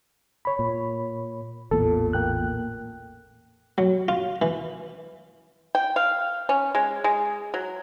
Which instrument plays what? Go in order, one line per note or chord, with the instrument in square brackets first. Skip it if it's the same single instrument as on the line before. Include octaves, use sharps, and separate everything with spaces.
[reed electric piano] C#5 B5
[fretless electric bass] A#2
[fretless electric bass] A1 E2 A#2 [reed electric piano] A4
[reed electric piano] A#3 G5 F#6
[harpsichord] F#3
F4
E3
[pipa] G5
F5
C#4
G#3
G#3
F#3